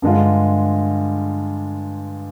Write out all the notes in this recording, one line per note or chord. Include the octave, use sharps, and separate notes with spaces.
G2 D3 G#3 D4 F4